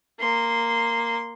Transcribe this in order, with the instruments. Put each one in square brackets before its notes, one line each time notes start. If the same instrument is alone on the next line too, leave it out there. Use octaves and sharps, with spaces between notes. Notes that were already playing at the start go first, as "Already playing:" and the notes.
[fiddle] A#3 C6